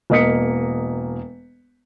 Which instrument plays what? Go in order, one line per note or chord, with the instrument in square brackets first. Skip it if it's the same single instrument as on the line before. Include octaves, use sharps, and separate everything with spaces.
[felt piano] E1 A#3 D#5 D#6 B6 C#7